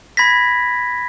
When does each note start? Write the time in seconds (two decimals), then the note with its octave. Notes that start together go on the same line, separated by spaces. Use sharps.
0.17 B5 G#6 A#6 B6